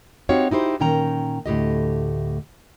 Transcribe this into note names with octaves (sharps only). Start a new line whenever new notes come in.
C4 D#4 F#4 G4 C#5 F5
D#4 E4 G4 C5
A#2 D#3 C#4 G5 A#5
D2 A2 G4 D#5